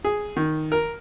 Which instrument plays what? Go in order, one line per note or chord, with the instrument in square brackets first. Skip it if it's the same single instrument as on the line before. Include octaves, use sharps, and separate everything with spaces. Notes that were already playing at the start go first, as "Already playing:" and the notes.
[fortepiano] G#4
D#3
A#4